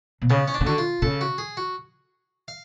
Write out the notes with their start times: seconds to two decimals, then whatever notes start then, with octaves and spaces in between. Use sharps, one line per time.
0.22 B2
0.30 C#3 B3
0.48 C#4
0.54 D4
0.61 C#3
0.66 D3 F#4
0.78 F4
1.02 C#3 A4
1.21 F#4
1.38 G#4
1.57 F#4
2.48 F5